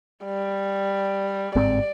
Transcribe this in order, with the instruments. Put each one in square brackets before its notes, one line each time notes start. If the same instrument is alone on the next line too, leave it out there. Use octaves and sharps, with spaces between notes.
[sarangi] G3
[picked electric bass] G1 G#2 C4 [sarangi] D5